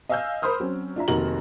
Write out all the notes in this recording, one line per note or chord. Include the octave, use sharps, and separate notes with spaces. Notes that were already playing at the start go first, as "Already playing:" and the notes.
D#5 F5 G#5 E6 F6 G6
A#4 C5 B5 C6 D#6 F6
F#3 C4 C#4
D4 F4 E5 A#5
F1 D#3 A#3 F#4 A#5 F#7